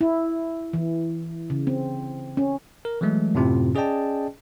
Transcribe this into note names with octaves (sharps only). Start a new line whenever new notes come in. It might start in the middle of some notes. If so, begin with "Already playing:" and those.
E4
E3
C#3
C4
C#4
A#4
E3 F#3 G#3 A3
F#2 A2 C3 C4 F4
C#4 G#4 D5 D#5 G5 A5